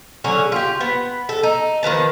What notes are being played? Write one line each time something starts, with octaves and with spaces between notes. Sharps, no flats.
D3 F#3 C#4 G#4
F4 G4
B3
A4
D#4
D#3 F3 B3 A5